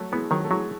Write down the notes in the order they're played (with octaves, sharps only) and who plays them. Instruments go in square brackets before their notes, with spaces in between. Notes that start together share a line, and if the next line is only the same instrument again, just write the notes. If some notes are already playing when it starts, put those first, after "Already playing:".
Already playing: [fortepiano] F#3 A3
[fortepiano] E3 G#3 [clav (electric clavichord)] B3
[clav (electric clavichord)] D#3 [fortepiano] F#3
[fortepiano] A3
[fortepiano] E3 G#3 [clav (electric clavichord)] F#3